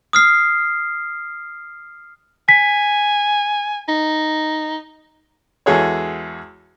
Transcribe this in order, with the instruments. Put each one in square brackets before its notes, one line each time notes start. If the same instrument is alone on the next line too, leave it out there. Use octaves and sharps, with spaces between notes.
[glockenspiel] D#6 F6 C7
[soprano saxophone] G#5 [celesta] B6
[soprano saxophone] D#4
[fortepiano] E2 G#3 F#4 G#4 A4 C#5